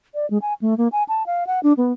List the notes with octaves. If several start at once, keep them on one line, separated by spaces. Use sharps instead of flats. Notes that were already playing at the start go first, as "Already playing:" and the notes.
D5
G#3
G#5
A3
A#3
G#5
A5
F5
F#5
D4
B3